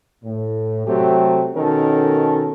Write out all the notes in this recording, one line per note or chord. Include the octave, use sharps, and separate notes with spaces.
A2
C3 F#3 A3 C4 G4
B2 D#3 C#4 A4 A#4